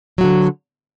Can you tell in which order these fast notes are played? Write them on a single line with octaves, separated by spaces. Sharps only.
F#3 F#4 D3